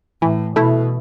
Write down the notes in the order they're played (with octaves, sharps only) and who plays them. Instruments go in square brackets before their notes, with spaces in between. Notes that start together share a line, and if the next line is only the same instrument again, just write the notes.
[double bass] A2 [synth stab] E3
[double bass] B2 [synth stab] A3 E4